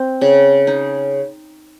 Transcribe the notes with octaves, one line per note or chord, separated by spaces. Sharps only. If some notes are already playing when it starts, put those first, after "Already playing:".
Already playing: C4
C#3
D#4